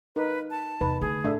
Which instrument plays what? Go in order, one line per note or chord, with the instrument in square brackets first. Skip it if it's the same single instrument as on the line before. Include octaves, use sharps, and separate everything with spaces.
[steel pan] D#4 A#4 [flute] B4
[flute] A5
[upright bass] E2 C3 [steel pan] D#4 B4
[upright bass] D3 A3 [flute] G#4
[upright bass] A2 [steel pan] A3 D4 E5